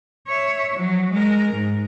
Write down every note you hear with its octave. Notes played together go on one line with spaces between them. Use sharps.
C#5 E5
F3 F#3
G#3 A#4
G#2